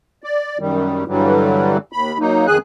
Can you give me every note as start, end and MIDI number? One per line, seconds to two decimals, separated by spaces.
0.24 0.58 74
0.59 1.04 42
0.59 1.04 51
0.59 1.04 55
1.08 1.78 43
1.08 1.78 50
1.08 1.78 52
1.08 1.78 54
1.08 1.78 55
1.92 2.18 39
1.92 2.18 83
2.20 2.47 54
2.20 2.47 58
2.20 2.47 63
2.47 2.58 41
2.47 2.58 51
2.47 2.58 68
2.47 2.58 80
2.47 2.58 90